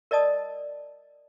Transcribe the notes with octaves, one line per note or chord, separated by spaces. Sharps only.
A#4 D5 D#5 A5 D#6